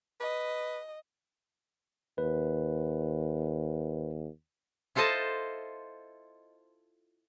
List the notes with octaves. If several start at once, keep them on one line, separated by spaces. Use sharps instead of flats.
B4 D#5
D#2 B4
E4 F4 A4 C5 D#5 A5